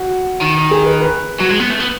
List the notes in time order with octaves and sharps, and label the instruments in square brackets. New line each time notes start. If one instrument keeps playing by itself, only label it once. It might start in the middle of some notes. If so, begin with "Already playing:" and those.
Already playing: [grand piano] F#4
[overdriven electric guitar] D#3
[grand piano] G#4
B4
B4
[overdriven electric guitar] F#3
G#3
B3
A3
B3